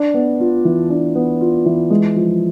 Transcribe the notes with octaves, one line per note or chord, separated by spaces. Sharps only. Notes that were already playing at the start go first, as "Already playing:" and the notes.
Already playing: D4
B3
F4
E3
D4
B3
F4
E3
G#3
F3